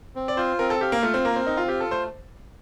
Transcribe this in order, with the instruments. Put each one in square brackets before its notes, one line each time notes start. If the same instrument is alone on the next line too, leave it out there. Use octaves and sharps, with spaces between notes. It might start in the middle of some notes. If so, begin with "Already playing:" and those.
[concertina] C4
[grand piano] D5
[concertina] F4 [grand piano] C5
[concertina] C4 [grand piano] A#4
[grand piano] A4
[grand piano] G4 [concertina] F5
[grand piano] A#3
[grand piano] A3 [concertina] F4
[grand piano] C4
[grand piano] A#3 [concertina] A#4
[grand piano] C4
[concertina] C4 [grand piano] D#4
[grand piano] F4
[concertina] F4 [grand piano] G4
[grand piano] A4
[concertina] A3 [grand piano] C5